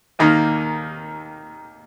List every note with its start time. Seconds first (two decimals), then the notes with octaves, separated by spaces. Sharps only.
0.19 D#2 D#3 A#3 D#4